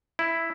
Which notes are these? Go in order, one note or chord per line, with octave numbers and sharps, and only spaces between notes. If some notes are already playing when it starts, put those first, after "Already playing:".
E4